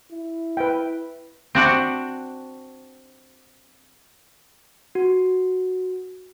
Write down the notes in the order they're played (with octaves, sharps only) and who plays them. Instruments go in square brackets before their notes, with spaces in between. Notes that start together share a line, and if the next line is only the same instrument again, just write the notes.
[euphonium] E4
[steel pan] B4 E5 G5
[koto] C4 D4 F#4
[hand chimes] F#4